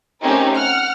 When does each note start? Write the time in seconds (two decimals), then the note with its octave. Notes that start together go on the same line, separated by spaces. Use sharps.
0.21 A3 C4 C#4 D#4 G4 A#4
0.55 F#5 F6